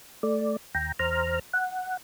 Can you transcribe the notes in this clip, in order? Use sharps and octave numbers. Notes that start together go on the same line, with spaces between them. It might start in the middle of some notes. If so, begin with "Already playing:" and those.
A3 D5
D#2 G5 A#5
E2 C5 A#5 F6
F#5